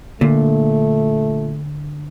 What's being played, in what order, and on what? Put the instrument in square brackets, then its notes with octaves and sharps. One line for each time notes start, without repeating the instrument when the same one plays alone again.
[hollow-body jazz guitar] A#2 [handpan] D3 [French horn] A3